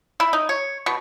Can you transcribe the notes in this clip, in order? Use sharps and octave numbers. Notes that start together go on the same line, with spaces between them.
E4
D#4
C#5
B2